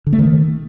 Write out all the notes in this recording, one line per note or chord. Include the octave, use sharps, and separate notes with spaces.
D3
A3
D#3